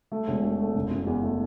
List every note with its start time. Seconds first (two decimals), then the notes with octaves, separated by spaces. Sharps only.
0.12 A3
0.27 E1
0.43 A3
0.59 A3
0.75 F#1
0.91 F#1
1.07 E2
1.23 A3